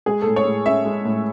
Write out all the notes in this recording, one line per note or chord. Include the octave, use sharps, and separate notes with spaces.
G#3 G#4
A2 A4
C#5
A2
C#4 E5
G#3
A2